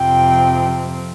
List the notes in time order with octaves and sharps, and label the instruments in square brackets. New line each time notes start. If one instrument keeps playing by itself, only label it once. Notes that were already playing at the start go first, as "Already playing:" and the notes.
Already playing: [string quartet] F2 C3 F3 C4 G5